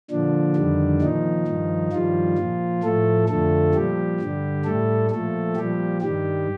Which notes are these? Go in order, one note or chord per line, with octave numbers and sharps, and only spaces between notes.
A#2 D3 F3 D4
F2 D#3 G3
A#2 D#3 F3 D#4
G2 F3
G2 D#3 F3 G3 F4
A#2 F3
A2 F3 A3 A4
F2 D3 F3 A3 A4
A#2 F3 G3 G4
G2 D3 G3
A2 G3 A3 A4
A#2 F3 A3 A4
A#2 F3 G3 G4
G2 D#3 G3 G4